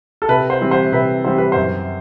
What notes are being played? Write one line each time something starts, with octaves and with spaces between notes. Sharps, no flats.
A4
C3 B4
C5
E3 G3 C4
C5
C3 B4
E3 G3 C4 C5
B4
F#2 C5